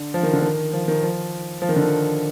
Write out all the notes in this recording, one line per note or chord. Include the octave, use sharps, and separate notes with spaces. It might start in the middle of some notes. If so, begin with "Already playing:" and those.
Already playing: D3
F3
D#3
D3
D#3
F3
D#3
F3
F3
D#3
D3
D#3